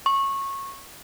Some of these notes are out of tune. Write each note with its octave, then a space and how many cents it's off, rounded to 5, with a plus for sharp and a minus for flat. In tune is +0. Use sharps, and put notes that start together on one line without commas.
C#6 -15